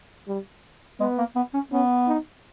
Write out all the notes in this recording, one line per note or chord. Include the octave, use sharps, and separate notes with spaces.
G3
G#3 B3
A#3
B3
C#4
B3 C#4
D#4